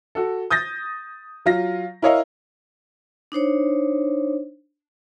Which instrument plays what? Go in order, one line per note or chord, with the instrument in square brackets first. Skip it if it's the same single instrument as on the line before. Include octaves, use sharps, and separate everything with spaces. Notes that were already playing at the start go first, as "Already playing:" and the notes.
[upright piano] F#4 A4
D#6 G6 A6 A#6
F#3 F4 A#6
E4 A#4 C#5 D#5 F5
[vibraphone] D4 D#4 C5 C#5